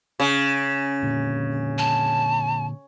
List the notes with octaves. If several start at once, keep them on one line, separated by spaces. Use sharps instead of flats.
C#3
A#2 D3
A5